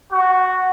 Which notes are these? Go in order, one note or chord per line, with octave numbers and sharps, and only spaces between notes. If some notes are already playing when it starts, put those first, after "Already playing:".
F#4